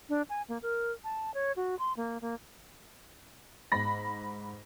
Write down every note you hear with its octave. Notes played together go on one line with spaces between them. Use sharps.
D4
G#5
A#3
A#4
A5
C#5
F#4
C6
A#3
A#3
G#2 B5 A#6